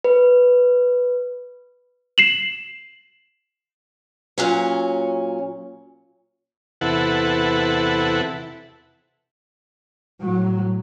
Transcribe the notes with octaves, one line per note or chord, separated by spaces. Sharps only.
B4
C7 E7 F#7
A#2 F#3 C#4
E2 C3 E4 A4 B4 F#5
A2 F#3